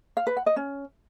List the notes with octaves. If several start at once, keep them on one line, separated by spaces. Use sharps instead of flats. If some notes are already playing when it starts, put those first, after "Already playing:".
F5
B4
F#5
D#5
C#4